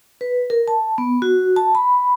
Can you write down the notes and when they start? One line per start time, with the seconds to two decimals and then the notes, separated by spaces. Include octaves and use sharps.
0.21 B4
0.50 A#4
0.68 A5
0.98 B3
1.22 F#4
1.56 A5
1.75 B5